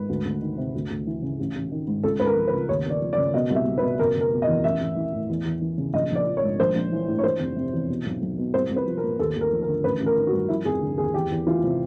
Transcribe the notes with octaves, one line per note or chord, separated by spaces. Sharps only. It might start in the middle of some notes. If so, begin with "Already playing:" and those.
Already playing: G#2 B4
D2
D2
D#3
C3
D2
D2
E3
C#3
A1
A1
D#3
G#2
C#2 A4
C#2 B4
A#4
F3
B4
C#3
D#2 C#5
D#2 D5
F3
D5
C#3
B2 D#5
C2
E5
C2
B4
B2
F#1 A#4
F#1
A#4
B2
D#5
E2
A1 E5
A1
E3
A2
E2
E2
E3
C#3
A#1 D#5
A#1 D5
F3
C#5
G#2
A#1 C5
A#1
E3
A2
C#5
E3 C5
F1
C3
E2
B2
B1
B1
B2
C2 C5
C2
B4
F3
A#4
A#2
D#2 A4
D#2
A#4
F3
A#4
D3
A1 B4
A1
A#4
D#3
F#4
G2
F3 E4
F1 G#4
D3
D#2 G#4
E2 G4
E2
E3 F4
C3